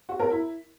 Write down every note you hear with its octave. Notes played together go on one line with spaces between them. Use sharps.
F#4
A#4
E4